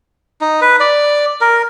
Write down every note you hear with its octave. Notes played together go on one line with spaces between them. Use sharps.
D#4
B4
D5
A#4